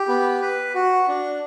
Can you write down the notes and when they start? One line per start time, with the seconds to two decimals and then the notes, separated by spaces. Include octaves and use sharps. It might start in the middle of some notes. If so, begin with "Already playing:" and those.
Already playing: G4
0.08 B3
0.42 B4
0.75 F#4
1.08 D4